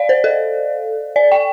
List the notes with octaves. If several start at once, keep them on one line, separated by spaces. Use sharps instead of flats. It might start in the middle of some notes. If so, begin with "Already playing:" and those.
Already playing: D5 F5
C5
A4
D5
G5